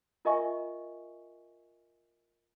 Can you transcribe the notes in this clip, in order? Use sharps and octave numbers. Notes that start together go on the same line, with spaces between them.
F4 A#4 D#5 E5 G#5 C#6